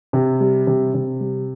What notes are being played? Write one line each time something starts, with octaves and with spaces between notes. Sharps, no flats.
C3
G3
C3
C3
G3